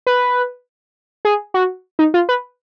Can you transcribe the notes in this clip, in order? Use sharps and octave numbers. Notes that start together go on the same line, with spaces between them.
B4
G#4
F#4
D#4
F4
B4